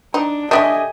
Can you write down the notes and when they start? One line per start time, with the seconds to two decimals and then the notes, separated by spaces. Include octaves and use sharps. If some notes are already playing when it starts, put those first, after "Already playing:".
0.14 D4 D#4
0.51 D3 A3 D4 G4 D#5 E5 G#5 D#6